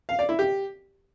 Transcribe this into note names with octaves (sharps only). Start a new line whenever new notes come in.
F5
D5
E4
G4